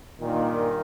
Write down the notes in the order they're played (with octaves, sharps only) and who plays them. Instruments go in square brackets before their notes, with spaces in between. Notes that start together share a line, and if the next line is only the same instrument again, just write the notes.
[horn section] G2 A#2 [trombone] D#3